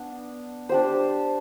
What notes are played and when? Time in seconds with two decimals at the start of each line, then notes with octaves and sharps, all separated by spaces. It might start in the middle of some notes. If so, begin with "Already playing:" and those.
Already playing: B3 D4
0.69 D4 G4 C5